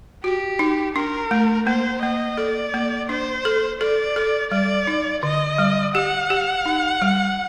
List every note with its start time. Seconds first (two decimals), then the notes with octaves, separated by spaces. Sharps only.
0.24 F#4 G4
0.59 D#4
0.95 D4 A#4
1.31 A3
1.66 A#3 C5
2.02 A#3 D#5
2.37 A4 D5
2.74 A#3
3.09 D4 C5
3.45 A4
3.81 A4 D5
4.16 A4
4.51 G3 D5
4.87 D#4
5.23 D3 D#5
5.58 G3
5.95 G4 F#5
6.30 G4
6.66 D#4
7.02 G3